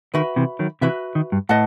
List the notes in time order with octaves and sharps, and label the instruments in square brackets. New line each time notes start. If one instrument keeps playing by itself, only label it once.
[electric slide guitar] D#3 [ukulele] F#4 B4 E5 B5
[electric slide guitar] C3 E3
D#3 F#3
[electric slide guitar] C3 E3 [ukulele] F#4 B4 E5 B5
[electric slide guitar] D#3
G2
[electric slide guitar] A2 [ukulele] B4 D#5 F#5 A5